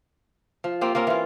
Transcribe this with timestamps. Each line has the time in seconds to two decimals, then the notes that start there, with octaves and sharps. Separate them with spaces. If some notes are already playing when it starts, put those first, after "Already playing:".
0.64 F3
0.81 A#3 C4 F4 G4
0.95 A#3 C4 C#4 A#4
1.07 E3 F4